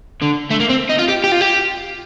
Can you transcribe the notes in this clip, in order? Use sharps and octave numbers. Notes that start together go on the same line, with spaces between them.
D3
A3
A#3
C4
D#4
F4
G4
G4
F4
G4